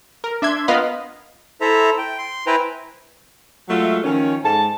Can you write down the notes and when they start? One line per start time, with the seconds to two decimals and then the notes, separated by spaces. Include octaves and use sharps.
0.24 A#4
0.42 D4 E5 C6 G#6
0.68 B3 F4 A#4 D#5 F5 B5
1.61 E4 A4 C5 E5 A#5
1.98 G5
2.18 C6
2.47 E4 B4 C5 G5 G#5 A#5
3.69 F#3 G#3 A3 F4 E5
4.03 D#3 F3 C#4
4.44 G#2 G#3 A5